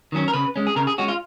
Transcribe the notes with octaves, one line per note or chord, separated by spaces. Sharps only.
D#3 F#3 C#4
A#4
C#3 B4
G#3 C#4
G#4
C#3 A#4
G#4
G#3 C#4 F#4
F4